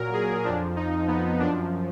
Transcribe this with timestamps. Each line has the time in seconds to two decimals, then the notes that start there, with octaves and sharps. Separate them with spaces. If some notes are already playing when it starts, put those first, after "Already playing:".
Already playing: A#2 F#3 A#4
0.13 G#4
0.45 F2 F3 D4
0.76 D#4
1.08 B3
1.40 F#2 F3 D4